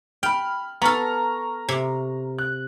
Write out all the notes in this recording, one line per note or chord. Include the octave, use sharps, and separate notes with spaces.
G5 B5 F6
B3 A4 A#5 C#6 F6
C3
F#6